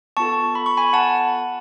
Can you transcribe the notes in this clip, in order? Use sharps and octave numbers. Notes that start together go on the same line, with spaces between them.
B3 F4 A4 A5 C#6
B5
C#6
G#5 B5
F#5 A5